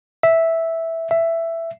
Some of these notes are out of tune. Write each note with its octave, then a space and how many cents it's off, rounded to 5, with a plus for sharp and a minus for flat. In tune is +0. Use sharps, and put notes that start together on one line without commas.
E5 -5
E5 +10